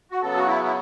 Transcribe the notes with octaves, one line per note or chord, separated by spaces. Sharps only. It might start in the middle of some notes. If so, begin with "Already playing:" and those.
F#4
C#3 F#3 B3 A4
F#4
E4
E4